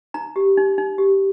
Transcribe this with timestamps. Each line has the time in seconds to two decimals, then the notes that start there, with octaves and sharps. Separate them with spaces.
0.14 D#4 A#5
0.36 G4
0.57 D#4
0.78 D#4
0.98 G4